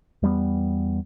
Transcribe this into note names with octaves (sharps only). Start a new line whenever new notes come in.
E2 G3 A#3 B3